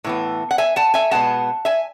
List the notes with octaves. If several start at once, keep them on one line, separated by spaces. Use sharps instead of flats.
A2 E3 B3
F#5
E5 G#5
F#5 A5
E5 G#5
B2 G#3 B3 F#5 A5
E5 G#5